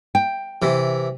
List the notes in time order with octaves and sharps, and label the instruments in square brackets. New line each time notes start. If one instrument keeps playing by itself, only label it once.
[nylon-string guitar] G5
[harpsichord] C3 E3